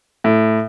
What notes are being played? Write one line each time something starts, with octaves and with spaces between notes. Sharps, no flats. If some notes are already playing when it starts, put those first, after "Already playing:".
A2